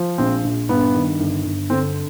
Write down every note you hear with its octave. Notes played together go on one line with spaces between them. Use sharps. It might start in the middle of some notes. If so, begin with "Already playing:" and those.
Already playing: F3
A#1 C4
A#1
G2 B3
D#3
G1
G1
D3 C4